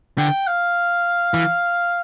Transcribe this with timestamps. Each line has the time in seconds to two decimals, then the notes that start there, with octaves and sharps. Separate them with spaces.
0.18 D3 G5
0.47 F5
1.34 E3